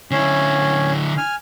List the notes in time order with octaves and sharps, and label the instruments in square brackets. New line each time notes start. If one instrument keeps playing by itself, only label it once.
[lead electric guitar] D3 E4 [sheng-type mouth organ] C#4
[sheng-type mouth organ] G#5 F6